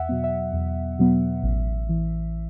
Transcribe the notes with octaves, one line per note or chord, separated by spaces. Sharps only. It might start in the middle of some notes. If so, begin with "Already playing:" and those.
Already playing: E2 E5 F#5
B2 F#3 B3
E5
E2
B2 F#3 B3
A1
E3